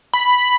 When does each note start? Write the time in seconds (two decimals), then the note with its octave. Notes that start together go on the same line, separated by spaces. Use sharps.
0.14 B5